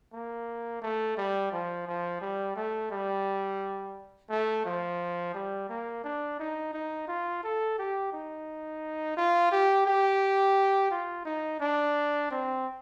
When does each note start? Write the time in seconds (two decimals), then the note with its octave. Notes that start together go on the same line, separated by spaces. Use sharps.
0.13 A#3
0.82 A3
1.17 G3
1.52 F3
1.87 F3
2.21 G3
2.56 A3
2.91 G3
4.30 A3
4.65 F3
5.35 G3
5.69 A#3
6.04 D4
6.39 D#4
6.74 D#4
7.08 F4
7.43 A4
7.78 G4
8.12 D#4
9.17 F4
9.52 G4
9.86 G4
10.91 F4
11.25 D#4
11.60 D4
12.31 C4